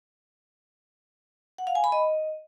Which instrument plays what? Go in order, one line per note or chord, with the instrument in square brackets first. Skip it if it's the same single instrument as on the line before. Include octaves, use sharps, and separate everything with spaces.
[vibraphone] F#5
F5
G#5
B5
D#5